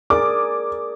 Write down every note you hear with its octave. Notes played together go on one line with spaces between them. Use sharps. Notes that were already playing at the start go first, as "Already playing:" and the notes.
G#4 A#4 D5 D6